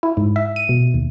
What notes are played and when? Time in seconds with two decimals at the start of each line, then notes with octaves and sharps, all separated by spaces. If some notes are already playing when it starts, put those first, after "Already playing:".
0.03 E4
0.17 G#2
0.36 E5
0.56 D#7
0.69 B2
0.94 D#2